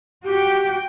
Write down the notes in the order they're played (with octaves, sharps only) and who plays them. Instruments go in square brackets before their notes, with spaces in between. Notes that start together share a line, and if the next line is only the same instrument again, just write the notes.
[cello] F#4 G5 [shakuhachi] G4